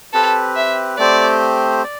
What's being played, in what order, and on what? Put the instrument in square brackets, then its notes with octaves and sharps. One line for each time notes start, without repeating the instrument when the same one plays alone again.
[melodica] C4 G4 B4 [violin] A4
[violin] E5
[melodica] A3 C4 G4 C5 [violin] D5
[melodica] D5